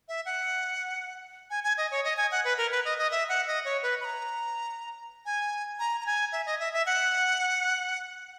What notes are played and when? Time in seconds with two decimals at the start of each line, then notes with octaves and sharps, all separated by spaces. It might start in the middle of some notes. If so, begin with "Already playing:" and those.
0.08 E5
0.26 F#5
1.50 G#5
1.64 G#5
1.78 D#5
1.91 C#5
2.04 D#5
2.17 G#5
2.31 F#5
2.44 B4
2.58 A#4
2.71 B4
2.85 D#5
2.98 D#5
3.11 E5
3.29 F#5
3.47 D#5
3.65 C#5
3.83 B4
4.01 B5
4.05 A#5
5.26 G#5
5.79 A#5
6.00 A#5
6.06 G#5
6.32 E5
6.46 D#5
6.60 E5
6.73 E5
6.86 F#5